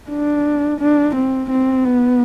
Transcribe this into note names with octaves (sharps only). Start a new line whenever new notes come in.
D4
D4
C4
C4
B3